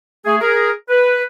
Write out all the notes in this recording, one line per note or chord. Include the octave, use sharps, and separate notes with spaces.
A3 G#4
G#4 A#4
B4